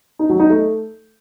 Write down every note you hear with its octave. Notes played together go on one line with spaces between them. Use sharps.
D#4
F#3
D#4
A3